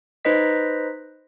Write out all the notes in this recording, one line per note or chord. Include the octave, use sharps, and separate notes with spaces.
D#4 B4 C5 D#5 B6